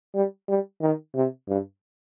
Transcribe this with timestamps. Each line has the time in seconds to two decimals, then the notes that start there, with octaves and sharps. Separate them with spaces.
0.14 G3
0.48 G3
0.81 D#3
1.15 C3
1.48 G2